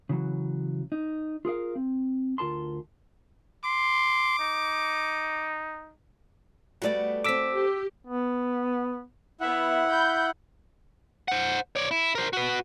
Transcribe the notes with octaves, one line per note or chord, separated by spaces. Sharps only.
C#3 E3 F#3
D#4
F4 G#4 A#4 F5
C4
D2 F4 A#4 A5 C6
C6 D6
D#4
G3 A3 B3 F#4 D5
C4 A4 D6 E6 B6
G4
B3
B3 E4 E5 F#5
B5 G6
C5 F#5
C#5 D5
E4
A#4 C5
F#4 B4